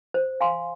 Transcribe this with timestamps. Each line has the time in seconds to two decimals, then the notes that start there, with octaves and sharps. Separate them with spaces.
0.14 C5
0.41 F5 G#5 C6